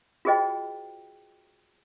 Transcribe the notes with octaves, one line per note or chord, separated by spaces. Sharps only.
F4 F#4 G#4 C5 D#5 G5